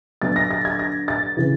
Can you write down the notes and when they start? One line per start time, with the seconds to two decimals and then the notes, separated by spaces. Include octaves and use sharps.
0.22 D3 F#3 B3 D4 A6
0.36 A#6
0.51 A6
0.65 G#6
0.79 A#6
1.08 A6
1.37 C#3 E3